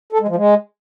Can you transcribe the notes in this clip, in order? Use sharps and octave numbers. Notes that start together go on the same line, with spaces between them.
A4
G#3
F3
G#3